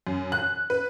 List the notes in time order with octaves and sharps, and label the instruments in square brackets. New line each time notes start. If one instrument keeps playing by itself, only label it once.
[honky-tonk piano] F#2
F#6
B4